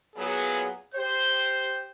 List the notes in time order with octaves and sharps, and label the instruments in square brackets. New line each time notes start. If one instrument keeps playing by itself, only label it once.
[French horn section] A#2 F#3 B3 [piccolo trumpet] G#4
[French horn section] G4 C5 [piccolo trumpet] G6